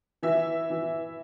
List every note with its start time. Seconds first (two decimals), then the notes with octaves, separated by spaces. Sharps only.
0.23 E3 E5
0.70 E3